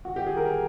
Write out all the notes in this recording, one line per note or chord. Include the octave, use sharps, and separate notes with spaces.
F#4
G4
G#4
A#4